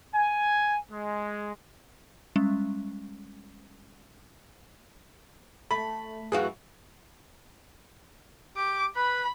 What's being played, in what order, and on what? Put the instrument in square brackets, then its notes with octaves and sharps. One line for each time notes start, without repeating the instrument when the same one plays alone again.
[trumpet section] G#5
G#3
[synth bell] G3 G#3 C#4
[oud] A3 [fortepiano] B5
[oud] F#2 E3 F#4 [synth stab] G#4 F5
[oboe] G4 [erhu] D6
[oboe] B4 [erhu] B5